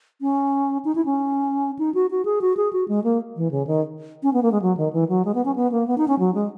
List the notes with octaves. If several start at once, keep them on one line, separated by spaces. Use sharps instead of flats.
C#4
D#4
E4
C#4
D#4
F#4
F#4
G#4
F#4
G#4
F#4
G#3
A#3
E3
C#3
D#3
C#4
B3
A#3
G#3
F#3
D#3
E3
F#3
G#3
B3
C#4
B3
A#3
B3
D#4
C#4
F#3
G#3